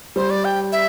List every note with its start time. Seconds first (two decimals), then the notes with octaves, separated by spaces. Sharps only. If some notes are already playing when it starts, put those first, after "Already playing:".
0.16 G3 C5
0.30 D5
0.45 G5
0.72 E5